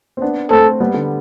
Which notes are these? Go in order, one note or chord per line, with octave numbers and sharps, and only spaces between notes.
C4
B3 D4
A3 C4 A4
G3 B3
D3